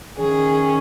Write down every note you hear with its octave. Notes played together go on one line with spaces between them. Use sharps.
D#3 C#4 G#4